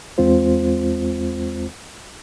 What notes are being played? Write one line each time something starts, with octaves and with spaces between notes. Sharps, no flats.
E2 G#3 C4 F4 C5